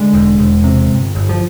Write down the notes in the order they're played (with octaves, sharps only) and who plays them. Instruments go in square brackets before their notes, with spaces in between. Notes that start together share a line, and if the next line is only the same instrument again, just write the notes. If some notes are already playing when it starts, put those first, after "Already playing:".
Already playing: [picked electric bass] D3 G#3
E1
E1
C3
G1
G1
F3